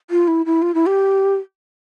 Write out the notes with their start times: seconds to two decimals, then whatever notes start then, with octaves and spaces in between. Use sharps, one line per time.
0.10 F4
0.28 E4
0.46 E4
0.62 F4
0.74 E4
0.86 G4